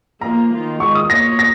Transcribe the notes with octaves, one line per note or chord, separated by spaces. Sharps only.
F3 A#3 F4 A#5
D#3 A#3 F4
D#3 G#3 F4 C#6
D#6
A#3 F4 C#5 A#6
A#6